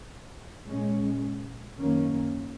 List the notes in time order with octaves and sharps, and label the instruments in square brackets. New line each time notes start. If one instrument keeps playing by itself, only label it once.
[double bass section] A#2 G#3 C#4
F#2 D#3 A#3 C#4